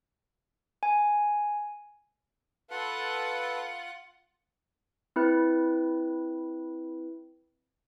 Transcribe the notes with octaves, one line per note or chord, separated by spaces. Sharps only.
G#5
F4 A4 B4 F#5
C4 E4 B4